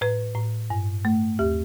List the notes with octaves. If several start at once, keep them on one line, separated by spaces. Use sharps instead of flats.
A2 B4
A2
G2
A3
D#2 G4